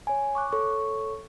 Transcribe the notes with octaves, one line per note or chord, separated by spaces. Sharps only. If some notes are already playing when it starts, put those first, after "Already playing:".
C#5 G#5
C#6 D6 F#6
A4 C#5 C#6